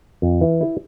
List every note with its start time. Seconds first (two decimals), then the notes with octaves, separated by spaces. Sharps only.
0.22 F2
0.41 E3
0.61 E4